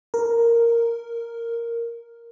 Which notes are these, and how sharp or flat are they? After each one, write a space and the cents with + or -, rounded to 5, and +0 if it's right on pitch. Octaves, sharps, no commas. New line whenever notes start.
A#4 -5